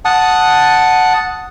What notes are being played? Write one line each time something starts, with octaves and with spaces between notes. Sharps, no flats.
F#5 A5 D#6